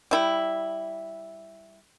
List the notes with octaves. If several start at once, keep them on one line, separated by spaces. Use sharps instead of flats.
G3 E4